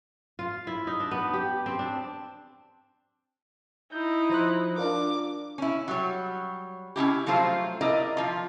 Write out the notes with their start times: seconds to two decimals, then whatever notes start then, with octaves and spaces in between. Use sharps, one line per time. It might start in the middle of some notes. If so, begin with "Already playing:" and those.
0.39 F4
0.67 E4
0.87 D#4
1.00 D4
1.11 B3
1.33 G4
1.66 C4
1.79 D4
3.92 D#4 E4 G6
4.30 F3 C5 F#6
4.77 D4 F4 A#4 D6
5.58 C#4 E4
5.88 F#3 G3 C#5
6.96 C#4 D#4 E4 G4
7.26 F3 F#3 A3 F4 C5
7.81 E4 A#4 D5 D#5
8.17 F3 F4